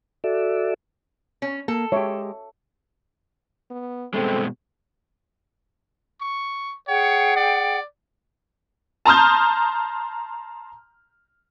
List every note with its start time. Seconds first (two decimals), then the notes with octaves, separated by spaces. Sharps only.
0.24 F#4 A4 D5 E5
1.42 C#4
1.68 A#3 A4
1.92 G#3 G4 C#5 E5
3.71 B3
4.14 G2 B2 G#3 C4 A4
6.21 C#6
6.88 G#4 C#5 F#5 G5
7.37 D5
9.05 A5 A#5 C6 D#6 F6 G6